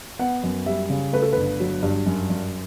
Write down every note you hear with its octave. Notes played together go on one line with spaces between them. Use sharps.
B3 F#5
F#2
G3 E5
C#3
A3 B4
A4
G1 B4
F#3
G2
F#2
F#2